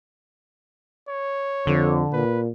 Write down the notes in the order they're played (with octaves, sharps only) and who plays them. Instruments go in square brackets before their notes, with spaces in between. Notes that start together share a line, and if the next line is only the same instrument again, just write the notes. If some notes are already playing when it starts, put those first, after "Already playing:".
[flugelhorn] C#5
[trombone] F2 [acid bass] D3
[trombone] A#2 [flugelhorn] B4